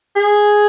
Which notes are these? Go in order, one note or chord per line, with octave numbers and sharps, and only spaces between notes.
G#4